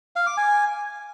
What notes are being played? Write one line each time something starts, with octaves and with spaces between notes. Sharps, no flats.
F5
D6
G#5